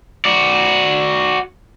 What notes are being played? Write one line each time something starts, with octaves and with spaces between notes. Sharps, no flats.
F#4 D5